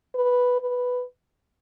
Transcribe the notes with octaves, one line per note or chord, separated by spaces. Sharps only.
B4
B4